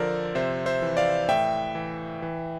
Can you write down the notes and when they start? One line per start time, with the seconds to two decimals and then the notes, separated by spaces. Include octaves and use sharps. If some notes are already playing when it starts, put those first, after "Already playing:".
Already playing: D3 F3 A4 A#4 C5 D5
0.35 C3 C5 E5
0.66 C5 E5
0.82 E3
0.97 D5 F5
1.29 A2 E5 G5
1.75 E3
2.22 E3